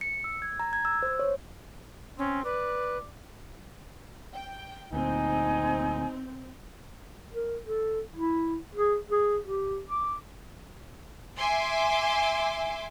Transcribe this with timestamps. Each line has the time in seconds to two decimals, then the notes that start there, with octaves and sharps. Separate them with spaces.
0.01 C#7
0.24 E6
0.42 G#6
0.60 A#5
0.73 G#6
0.85 E6
1.03 C5
1.19 C#5
2.19 C4 C#4
2.45 B4 D5
4.33 G5
4.93 D2 A#2 C4 D#4 G#5
7.33 A#4
7.65 A4
8.16 E4
8.75 G#4
9.10 G#4
9.43 G4
9.88 D6
11.38 E5 G#5 C6 D6